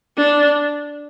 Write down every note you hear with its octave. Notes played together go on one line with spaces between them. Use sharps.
D4